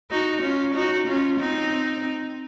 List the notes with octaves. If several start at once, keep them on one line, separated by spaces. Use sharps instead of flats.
D#4 F#4
C#4 F4
D#4 F#4
C#4 F4
C4 D#4